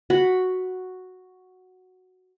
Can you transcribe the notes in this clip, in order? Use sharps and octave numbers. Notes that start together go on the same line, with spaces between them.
F#4 F#5 B5